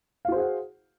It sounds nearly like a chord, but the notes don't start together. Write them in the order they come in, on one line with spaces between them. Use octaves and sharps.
F5 F#4 C5 G#4 F#5